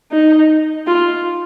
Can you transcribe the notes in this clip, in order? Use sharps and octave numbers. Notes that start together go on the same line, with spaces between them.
D#4
F4